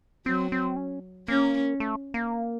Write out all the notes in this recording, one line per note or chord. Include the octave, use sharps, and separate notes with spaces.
F#3 C4
C4
C#4
A#3 C#4
A3
A#3